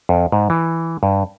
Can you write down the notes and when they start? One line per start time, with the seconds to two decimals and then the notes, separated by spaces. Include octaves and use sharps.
0.09 F2
0.32 G#2
0.50 E3
1.03 G2